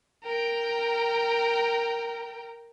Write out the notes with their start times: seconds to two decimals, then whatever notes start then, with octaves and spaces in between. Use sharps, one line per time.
0.24 A#4 G5